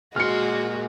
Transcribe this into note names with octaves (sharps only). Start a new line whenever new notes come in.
A#2 G#3 F#4 C6 F6 C#7